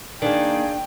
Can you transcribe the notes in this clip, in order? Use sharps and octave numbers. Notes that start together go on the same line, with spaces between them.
D#3 A#3 D4 G#4 D5 F5 G5